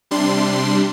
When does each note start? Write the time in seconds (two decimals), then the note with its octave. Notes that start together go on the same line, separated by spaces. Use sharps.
0.11 C3 G3 D4 C6